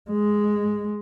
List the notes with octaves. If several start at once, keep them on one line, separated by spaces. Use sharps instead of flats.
G#3